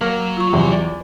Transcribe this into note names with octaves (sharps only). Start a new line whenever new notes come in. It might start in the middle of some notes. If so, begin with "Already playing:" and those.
F#3 A#3 A#4 A#5
F4 C#6
E2 C3
D5